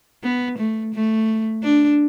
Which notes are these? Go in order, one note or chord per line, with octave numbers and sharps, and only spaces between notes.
B3
A3
A3
D4